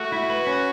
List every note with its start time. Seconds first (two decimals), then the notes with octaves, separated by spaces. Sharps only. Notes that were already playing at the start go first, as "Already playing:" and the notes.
Already playing: A3 F#4
0.12 E4
0.30 B4
0.47 C#4